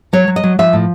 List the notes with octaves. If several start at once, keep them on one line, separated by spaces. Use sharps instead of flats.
F#3 C#5
F#3
D#5
F#3
F3 E5
A2